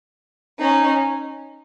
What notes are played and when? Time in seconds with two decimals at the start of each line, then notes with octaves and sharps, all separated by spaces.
0.61 C#4 D#4